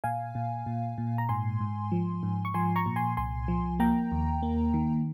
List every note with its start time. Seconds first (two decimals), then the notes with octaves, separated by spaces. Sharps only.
0.04 A#2 F5 G#5
0.35 A#2
0.66 A#2
0.98 A#2
1.18 A#5
1.29 G#2 G#5 C6
1.60 G#2
1.92 F3
2.23 G#2
2.45 C#6
2.54 F3 G#5 C6
2.76 A#5 C#6
2.86 A#2
2.96 G#5 C6
3.17 C2 G#5 C6
3.48 F3
3.79 A#3 G5 A#5
4.12 D#2
4.42 A#3
4.74 D#3